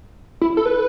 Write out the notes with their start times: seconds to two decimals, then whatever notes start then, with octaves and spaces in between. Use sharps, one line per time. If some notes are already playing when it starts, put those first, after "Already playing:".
0.41 E4
0.57 A4
0.66 B4